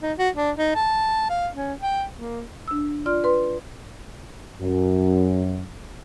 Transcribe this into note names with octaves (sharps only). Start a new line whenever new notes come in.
D#4
F#4
D4
D#4
A5
F5
C#4
G5
A#3
D4 E6
F4 D5 C6 F6
B4 C6
F#2